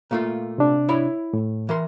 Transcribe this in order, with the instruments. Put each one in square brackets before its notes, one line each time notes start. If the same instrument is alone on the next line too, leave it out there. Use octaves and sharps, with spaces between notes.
[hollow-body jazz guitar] A#2 A3 F4
[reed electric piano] C3 D4
[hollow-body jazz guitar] E4 C#5 B5
[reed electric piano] A2
[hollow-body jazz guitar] E3 A#4 C6